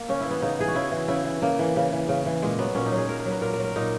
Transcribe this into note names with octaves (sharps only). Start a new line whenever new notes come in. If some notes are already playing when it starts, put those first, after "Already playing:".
Already playing: A#3
C#3 C#4
E3 E4
B3
C#3 D#4
E3 G#4
F#4
C#3 E4
E3
C#3 E4
E3
C#3 A#3
E3
C#3
E3
C#3
E3
A#2 G#3
F#3 B3
A#2 C#4
D#4
F#3
G#4
A#2 A#4
A#4
F#3
B4
A#2 A#4
A#4
F#3
A#4
A#2 D#4